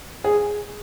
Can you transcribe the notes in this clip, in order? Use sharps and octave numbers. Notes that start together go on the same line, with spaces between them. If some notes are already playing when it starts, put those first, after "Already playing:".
G#4